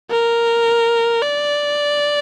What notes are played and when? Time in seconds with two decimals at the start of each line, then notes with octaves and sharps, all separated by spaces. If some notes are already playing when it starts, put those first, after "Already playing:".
0.11 A#4
1.22 D5